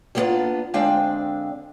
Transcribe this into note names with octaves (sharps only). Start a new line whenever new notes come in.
G3 A#3 B3 C#4 D4 F4
D2 G#3 C4 D4 F5 G5